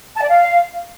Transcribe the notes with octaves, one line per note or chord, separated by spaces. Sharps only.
A5
D5
F5